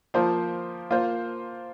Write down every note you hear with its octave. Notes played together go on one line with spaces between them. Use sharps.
F3 A#3 F4 C5
A#3 F4 C5